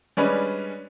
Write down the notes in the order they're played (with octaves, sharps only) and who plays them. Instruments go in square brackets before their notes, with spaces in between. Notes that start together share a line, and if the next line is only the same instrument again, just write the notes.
[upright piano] G3 G#3 C#4 D4 B4 D5